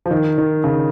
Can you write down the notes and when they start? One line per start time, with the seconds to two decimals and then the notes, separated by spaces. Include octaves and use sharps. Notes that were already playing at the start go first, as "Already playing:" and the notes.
0.06 F3
0.11 D#3
0.38 D#3
0.64 C#3